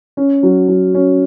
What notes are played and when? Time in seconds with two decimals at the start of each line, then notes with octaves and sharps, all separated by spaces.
0.17 C#4
0.43 F#3
0.68 F#3
0.94 C#4